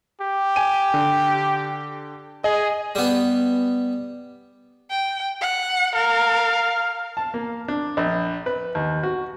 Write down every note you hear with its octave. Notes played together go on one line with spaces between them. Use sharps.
G4
G#5 D#7
D3
G#4 D#5
G3 B3
G5
F#5
A#4 F5
A5
A#3
D4
A#1
B4
D#2
F#4